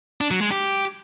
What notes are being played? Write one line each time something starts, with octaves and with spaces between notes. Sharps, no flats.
D4
F#3
G#3
G4